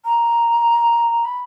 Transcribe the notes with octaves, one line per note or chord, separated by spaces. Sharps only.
A#5
B5